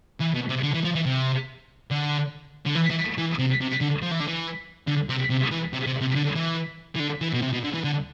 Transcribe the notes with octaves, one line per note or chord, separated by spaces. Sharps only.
E3
B2
C3
D3
E3
F3
E3
C3
D3
D3
E3
E3
E3
C3
C3
D3
F3
E3
D3
E3
D3
C3
C3
E3
C3
C3
C3
D3
E3
E3
D3
E3
B2
C3
B2
D3
E3
D3